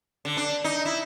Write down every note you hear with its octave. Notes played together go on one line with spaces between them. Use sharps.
D3
D4
D#4
E4